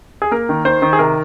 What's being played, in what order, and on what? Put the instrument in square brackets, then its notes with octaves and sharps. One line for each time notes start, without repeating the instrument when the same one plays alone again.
[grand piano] G#4
A#3 A#4
D#3
D#3 C5
D#3
G#4
C3 A#4